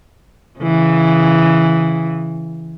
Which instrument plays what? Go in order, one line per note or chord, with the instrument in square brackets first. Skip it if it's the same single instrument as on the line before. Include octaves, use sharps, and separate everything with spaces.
[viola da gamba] C#3 E3